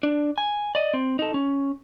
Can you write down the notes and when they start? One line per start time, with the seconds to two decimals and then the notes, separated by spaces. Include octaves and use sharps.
0.03 D4
0.38 G#5
0.75 D5 D#5
0.94 C4
1.19 D#4 A4
1.34 C#4